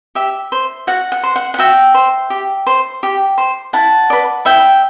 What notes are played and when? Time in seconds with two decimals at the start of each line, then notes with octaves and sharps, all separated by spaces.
0.15 G4 E5
0.52 C5
0.87 F#4 F#5
1.12 F#5
1.23 C5
1.36 F#5
1.54 F#5
1.59 F#4 E5 G5
1.94 C5
2.30 G4
2.67 C5
3.03 G4
3.38 C5
3.73 E4 F#5 A5
4.10 B4 D5
4.45 E4 E5 G5